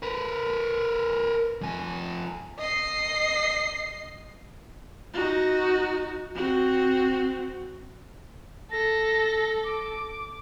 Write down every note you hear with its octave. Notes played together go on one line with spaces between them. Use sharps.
A#4 B4
F2 G#5
D#5 C7
D#4 F#4
C4 F#4
A4 A#6
D6